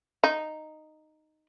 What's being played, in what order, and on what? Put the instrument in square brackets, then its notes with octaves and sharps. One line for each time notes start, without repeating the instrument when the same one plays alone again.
[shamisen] D#4